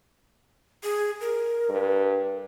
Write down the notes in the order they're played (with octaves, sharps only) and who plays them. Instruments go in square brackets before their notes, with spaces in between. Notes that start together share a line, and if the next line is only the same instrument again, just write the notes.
[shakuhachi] G#4
A#4
[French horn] G2